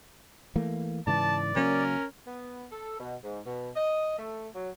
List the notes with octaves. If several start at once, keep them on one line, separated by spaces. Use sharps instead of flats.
E3 A3 A#3
G#2 C#3 E3 D5 A5
C#3 F#3 A#3 C#4 A#4
B3
A4
B2
G#2
B2
D#5
A3
F#3